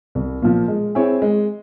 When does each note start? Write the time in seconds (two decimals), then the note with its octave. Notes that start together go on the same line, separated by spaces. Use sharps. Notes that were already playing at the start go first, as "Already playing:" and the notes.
0.15 C2
0.42 A#2 F3
0.68 G#3
0.95 C4 E4 G#4 C#5
1.22 G#3